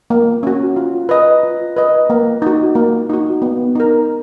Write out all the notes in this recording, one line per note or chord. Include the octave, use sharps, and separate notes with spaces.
A#3
C#4 F#4
F4
B4 D#5
F4
B4 D#5
A#3
D#4 F#4
A#3
D#4 F#4
B3
D#4 A#4